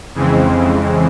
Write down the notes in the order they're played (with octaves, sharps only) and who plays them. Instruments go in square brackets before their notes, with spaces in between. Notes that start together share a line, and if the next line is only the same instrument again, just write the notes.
[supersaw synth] F2 C#3 E3 G#3 C4